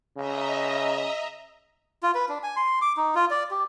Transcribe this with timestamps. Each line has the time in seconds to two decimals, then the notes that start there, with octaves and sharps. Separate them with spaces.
0.17 C#3 D#5 E5 A#5
2.03 F4
2.15 B4
2.29 D4
2.43 G#5
2.56 C6
2.82 D6
2.97 D#4
3.15 F4
3.31 D5
3.51 G4